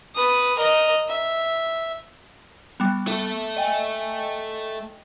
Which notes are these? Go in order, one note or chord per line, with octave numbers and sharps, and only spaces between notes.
B4 D#6
A#4 D#5
E5
G3 B3
A3 A4
D#5 G5 G#5